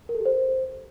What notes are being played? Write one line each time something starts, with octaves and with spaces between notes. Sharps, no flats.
A#4
A4
G4
C5